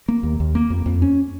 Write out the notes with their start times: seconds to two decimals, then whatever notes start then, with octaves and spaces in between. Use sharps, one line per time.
0.08 A#3
0.23 D#2
0.40 D#2
0.55 A#3
0.70 F2
0.86 F2
1.02 C#4